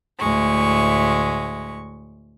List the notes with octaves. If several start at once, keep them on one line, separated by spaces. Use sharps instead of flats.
D2 A2 G#3 C#6